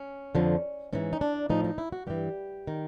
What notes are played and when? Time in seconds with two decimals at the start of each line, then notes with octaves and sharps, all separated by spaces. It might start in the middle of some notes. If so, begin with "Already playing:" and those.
Already playing: C#4
0.35 F2 D3 F3
0.93 G#2 E3 C#4
1.13 D#4
1.21 D4
1.50 A2 F3 D#4
1.64 D#4
1.78 E4
1.92 F#4
2.07 G2 E3 G4
2.67 D#3